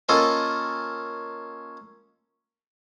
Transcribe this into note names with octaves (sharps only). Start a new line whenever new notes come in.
A#3 C#4 F4 A4 D#5